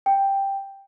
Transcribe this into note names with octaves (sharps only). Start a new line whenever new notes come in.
G5